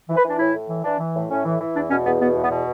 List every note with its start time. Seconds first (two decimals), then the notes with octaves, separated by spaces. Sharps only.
0.09 E3
0.16 B4
0.24 E3 D4
0.39 A2 E4
0.54 A2
0.69 E3
0.84 E3 D4
0.99 E3
1.15 A2
1.30 A2 C#4
1.45 E3
1.60 E3
1.75 E2 D4
1.91 B2 C#4
2.06 E2 B3
2.21 B2 B3
2.36 E2
2.44 B3
2.51 B2